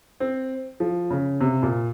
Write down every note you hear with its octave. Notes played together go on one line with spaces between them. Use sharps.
C4
F3
C#3
C3
A#2